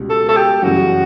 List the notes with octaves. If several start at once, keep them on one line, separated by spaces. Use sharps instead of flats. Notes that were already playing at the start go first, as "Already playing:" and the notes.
Already playing: C#2 B2 G3
A4
A4
G4
F#2 C#3 E3 G3 F#4